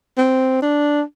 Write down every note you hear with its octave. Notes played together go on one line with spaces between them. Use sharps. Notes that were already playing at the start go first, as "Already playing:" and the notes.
C4
D4